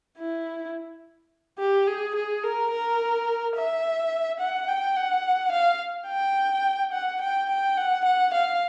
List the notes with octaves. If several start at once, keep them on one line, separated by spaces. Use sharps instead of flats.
E4
G4
G#4
G#4
A#4
A#4
E5
F#5
G5
F#5
F5
G5
F#5
G5
G5
F#5
F#5
F5